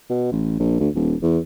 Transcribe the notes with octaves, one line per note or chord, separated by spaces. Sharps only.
B2
A1
A#1
D2
D#1
E2